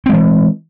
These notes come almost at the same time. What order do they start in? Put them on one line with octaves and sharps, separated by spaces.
C4 G#3 E3